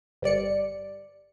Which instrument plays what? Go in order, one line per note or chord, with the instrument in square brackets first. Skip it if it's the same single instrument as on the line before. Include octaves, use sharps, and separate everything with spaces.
[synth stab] G1 G3 D5 C#7